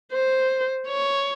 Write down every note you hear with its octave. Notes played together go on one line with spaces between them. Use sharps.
C5
C#5